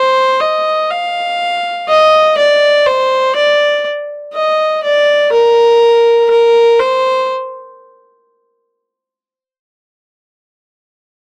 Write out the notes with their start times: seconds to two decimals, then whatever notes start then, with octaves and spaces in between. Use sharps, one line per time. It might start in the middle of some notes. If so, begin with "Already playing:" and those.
Already playing: C5
0.41 D#5
0.91 F5
1.88 D#5
2.38 D5
2.87 C5
3.35 D5
4.34 D#5
4.83 D5
5.32 A#4
6.30 A#4
6.79 C5